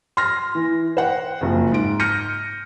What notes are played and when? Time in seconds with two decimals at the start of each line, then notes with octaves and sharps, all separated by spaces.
0.17 C6 F6 A#6
0.55 E3
0.97 C5 F#5 G5
1.41 F#1 F2
1.72 G#2 D7
2.00 F6 G6 A#6 C#7 D#7